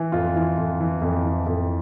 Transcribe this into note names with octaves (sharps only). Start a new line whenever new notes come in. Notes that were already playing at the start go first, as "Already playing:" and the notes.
Already playing: E3
F2 F4
E3
F2
E3
F2
E3
F2